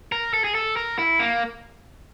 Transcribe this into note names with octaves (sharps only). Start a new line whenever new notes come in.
A#4
A4
G#4
A4
A#4
E4
A#3